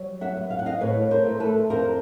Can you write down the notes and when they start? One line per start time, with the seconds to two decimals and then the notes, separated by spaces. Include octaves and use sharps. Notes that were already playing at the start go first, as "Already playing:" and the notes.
Already playing: F#3 G3
0.21 E5 F#5
0.37 B3
0.50 F5
0.59 F#5
0.66 D#5 F5
0.81 A2 B4 C#5
1.11 A#4 C5
1.26 A3
1.40 A4 B4
1.70 F2 A#4 C5